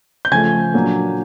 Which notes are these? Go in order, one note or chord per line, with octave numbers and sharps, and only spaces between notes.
G6
C#3 F3 A3 G#5 G#6
A#2 F#3 A#3 D4